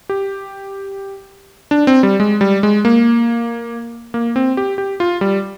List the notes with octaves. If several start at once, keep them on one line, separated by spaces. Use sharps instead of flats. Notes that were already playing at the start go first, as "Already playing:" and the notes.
G4
D4
C4
G3
G#3
G3
G#3
A#3
A#3
C4
G4
G4
F4
G3